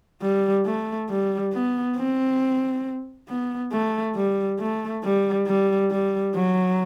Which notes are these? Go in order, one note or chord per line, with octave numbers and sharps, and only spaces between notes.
G3
A3
G3
B3
C4
B3
A3
G3
A3
G3
G3
G3
F#3